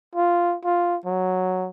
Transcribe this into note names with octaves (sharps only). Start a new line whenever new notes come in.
F4
F4
F#3